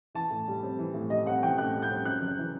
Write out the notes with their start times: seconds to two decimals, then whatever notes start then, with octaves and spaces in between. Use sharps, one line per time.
0.15 E3 A5
0.30 A2
0.48 G3
0.63 C4
0.79 E3
0.94 A2
1.10 G3 D#5
1.26 C4 F#5
1.43 E3 G5
1.58 A2 F#6
1.74 G3
1.82 G6
1.91 C4
2.05 F#2 F#6
2.21 F#1
2.38 E3